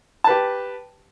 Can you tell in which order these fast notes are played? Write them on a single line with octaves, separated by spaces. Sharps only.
A5 B4 G4